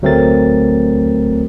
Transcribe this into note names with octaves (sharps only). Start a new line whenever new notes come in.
D2 F#3 A3 C4 A#4 A6